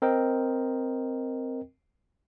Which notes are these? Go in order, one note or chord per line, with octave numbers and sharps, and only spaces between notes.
C4 A#4 D#5 G5